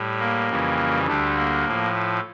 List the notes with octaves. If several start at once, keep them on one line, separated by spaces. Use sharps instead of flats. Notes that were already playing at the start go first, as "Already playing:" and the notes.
Already playing: A2 G3
A#3
F2 C#3 E3 G3
D2 D3 G3 A3
A#3
A2 F3
A3